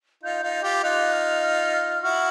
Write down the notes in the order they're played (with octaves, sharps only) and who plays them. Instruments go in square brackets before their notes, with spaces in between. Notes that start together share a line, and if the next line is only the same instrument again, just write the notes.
[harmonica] D#4 F4 [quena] G6
[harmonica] D#4 F4
[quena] G6
[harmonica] F4 G4
[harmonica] D#4 F4 [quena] F#6
[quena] F6
F6
F6
[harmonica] E4 F#4 [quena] F6